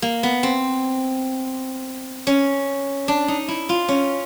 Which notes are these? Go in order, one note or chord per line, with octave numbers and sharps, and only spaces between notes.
A#3
B3
C4
C#4
D4
D#4
E4
F4
C#4